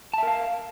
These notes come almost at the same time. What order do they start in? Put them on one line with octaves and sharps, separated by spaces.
A5 E5 A#4 F5